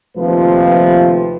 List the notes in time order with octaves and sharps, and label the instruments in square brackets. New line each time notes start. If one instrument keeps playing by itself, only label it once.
[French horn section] D#2 C3 F3 A3 F4 B4